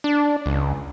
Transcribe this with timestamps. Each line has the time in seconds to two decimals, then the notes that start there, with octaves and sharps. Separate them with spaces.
0.04 D4
0.46 C#2